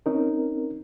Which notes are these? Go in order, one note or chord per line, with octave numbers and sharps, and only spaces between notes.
C4 C#4 D#4 A#4